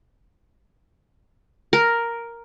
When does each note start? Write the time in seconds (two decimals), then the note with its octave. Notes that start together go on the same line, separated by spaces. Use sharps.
1.73 A#4